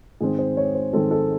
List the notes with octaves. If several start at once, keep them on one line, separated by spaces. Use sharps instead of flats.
G#2 D#3 G#3 C4 G#4
C5
C#5
C5
G#2 D#3 G#3 C4 A4
A4